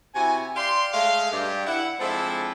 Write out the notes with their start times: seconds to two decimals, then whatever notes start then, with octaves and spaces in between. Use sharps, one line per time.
0.15 C3 E4 F#4 G#5
0.56 G4 D5 F5 C6
0.93 G#3 A3 F5
1.31 G2 G4
1.66 E4 F#5
1.99 F3 G#3 C4 D4 E4 A4